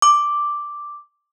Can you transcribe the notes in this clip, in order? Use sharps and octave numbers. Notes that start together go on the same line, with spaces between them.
D6